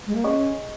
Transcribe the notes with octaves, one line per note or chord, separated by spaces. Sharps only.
G#3
A#3
C#4 G#4 D#5 C#6